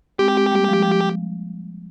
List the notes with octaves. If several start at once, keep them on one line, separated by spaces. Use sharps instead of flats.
G#3 C4 G4
G#3 C4
G3 A#3
F3 G#3
F3 G#3